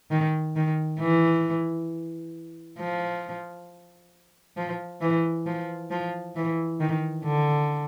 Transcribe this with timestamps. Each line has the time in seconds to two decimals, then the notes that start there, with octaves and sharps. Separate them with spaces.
0.11 D#3
0.56 D#3
1.00 E3
2.79 F3
4.57 F3
5.01 E3
5.46 F3
5.91 F3
6.36 E3
6.80 D#3
7.25 D3